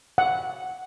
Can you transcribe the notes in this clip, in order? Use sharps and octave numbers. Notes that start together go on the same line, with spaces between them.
F#5